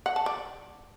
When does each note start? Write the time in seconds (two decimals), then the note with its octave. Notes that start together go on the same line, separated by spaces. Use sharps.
0.06 F#5
0.16 A5
0.26 D5